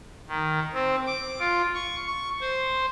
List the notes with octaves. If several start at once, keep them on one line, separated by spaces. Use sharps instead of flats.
D#3
C4
D6
F4
C#6
C#6
C5